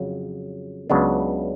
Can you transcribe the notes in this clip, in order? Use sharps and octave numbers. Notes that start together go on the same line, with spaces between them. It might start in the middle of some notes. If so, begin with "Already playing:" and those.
Already playing: F2 C#3 F#3
C#2 C#3 F#3 B3 D4